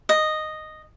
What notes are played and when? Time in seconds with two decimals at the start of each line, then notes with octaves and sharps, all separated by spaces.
0.09 D#5